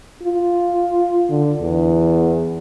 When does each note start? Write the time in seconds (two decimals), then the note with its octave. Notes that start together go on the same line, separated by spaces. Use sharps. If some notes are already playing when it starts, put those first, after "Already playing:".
0.24 F4
1.30 D3
1.61 E2